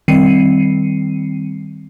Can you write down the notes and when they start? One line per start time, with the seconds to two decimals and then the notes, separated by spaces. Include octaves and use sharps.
0.08 D#3 G3 C4 C7 C#7 D#7